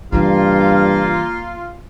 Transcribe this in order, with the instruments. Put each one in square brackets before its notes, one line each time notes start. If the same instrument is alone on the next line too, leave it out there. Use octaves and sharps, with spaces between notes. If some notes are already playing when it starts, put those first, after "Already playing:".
[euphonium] G2 [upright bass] C#3 E3 [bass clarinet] A#3 [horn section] F4